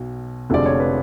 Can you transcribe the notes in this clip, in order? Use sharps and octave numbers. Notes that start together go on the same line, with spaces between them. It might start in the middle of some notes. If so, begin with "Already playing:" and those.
Already playing: B1 B2
F1 F2 D3 F3 G#3 D5
C#5
B4